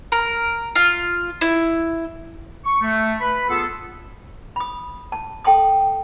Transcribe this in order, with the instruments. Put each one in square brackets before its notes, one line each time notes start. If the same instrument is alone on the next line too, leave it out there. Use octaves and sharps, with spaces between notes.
[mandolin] A#4
F4
E4
[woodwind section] C#6
A3
B4 B5
B3 F4 G#4 A4
[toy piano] B5 D#6
A5
A4 G5 A5 C6 D#6